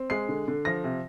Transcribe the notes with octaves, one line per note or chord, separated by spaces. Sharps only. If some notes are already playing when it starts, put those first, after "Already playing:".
Already playing: C4
G#3 C7
D3
D3
F3 A#6
C3